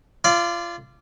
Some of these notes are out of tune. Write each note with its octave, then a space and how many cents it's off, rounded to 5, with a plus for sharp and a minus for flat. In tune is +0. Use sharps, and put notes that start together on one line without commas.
F4 -25 D5 +0